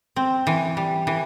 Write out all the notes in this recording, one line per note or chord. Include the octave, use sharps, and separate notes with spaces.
C4
E3
G3
E3